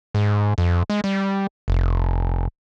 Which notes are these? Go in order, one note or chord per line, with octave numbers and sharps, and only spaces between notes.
G#2
F2
G#3
G3
F1